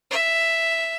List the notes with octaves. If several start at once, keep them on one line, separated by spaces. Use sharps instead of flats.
E5